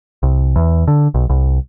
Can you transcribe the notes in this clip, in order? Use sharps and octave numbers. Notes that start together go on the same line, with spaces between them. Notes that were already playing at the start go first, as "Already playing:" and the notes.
C2
E2
D3
B1
C2